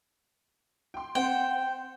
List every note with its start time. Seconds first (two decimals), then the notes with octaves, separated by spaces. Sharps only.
0.94 G5 C6
1.15 C4 C5 F#5 G5